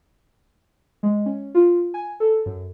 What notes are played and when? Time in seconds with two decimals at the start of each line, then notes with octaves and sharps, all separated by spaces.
1.03 G#3
1.26 C#4
1.55 F4
1.94 G#5
2.20 A4
2.46 F#2